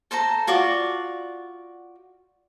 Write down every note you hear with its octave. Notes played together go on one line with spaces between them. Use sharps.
A4 C5 A5 A#5
F4 F#4 D5